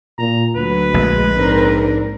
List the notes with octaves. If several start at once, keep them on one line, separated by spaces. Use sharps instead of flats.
A#2 A#5
D2 F#3 B4
A#1 G#3
G#2 C4 D4 A#4